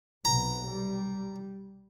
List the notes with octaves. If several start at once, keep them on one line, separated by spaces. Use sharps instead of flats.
B1 C3 B3 A#5
G3